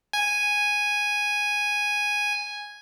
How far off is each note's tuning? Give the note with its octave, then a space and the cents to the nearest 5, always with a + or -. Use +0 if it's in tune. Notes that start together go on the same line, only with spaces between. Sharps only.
G#5 -5